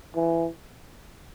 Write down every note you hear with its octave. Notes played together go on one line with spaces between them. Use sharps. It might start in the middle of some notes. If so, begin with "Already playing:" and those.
E3